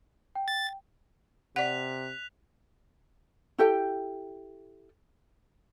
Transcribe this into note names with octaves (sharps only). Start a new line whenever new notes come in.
G5
A6
C3 D5 F#5 F#6 B6 F7
E4 G4 A4 G5